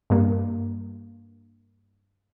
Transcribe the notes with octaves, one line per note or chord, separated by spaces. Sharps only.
G2 A#3